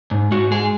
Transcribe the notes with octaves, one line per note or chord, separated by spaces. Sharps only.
G#2
G#2 F#4
G#3 G#4